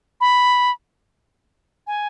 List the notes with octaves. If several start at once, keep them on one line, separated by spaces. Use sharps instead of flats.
B5
G#5